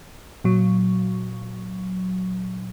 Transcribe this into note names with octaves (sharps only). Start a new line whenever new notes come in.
A#2 F#3